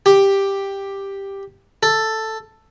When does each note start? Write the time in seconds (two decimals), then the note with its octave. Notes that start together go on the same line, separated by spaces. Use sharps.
0.06 G4
1.83 A4